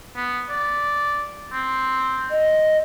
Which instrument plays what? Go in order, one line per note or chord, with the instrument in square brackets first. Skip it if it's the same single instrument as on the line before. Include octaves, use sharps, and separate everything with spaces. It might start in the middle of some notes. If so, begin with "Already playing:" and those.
[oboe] B3
D5
C4
[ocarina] D#5